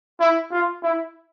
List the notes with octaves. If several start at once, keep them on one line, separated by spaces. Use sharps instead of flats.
E4
F4
E4